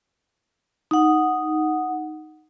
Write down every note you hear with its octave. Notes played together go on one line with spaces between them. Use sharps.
D#4 F#5